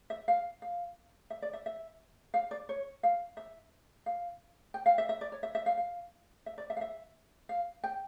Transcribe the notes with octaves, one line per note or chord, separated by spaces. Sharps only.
E5
F5
F5
E5
D5
E5
E5
F5
D5
C#5
F5
E5
F5
G5
F5
E5
E5
D5
C#5
E5
E5
F5
F5
E5
D5
E5
F5
E5
F5
G5